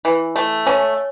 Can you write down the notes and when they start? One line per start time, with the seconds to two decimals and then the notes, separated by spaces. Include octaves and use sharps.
0.05 E3
0.36 A3
0.67 C#4